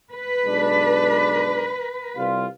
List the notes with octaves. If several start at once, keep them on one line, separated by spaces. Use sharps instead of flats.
B4
B1 G#3 D4
C2 G3 F4